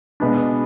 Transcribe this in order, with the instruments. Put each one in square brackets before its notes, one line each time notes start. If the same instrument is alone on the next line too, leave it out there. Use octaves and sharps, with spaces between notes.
[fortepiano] B2 G#3 B3 D4